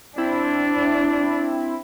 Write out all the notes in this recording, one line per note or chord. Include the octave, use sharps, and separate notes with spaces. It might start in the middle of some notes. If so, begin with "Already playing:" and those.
C4 D4 E4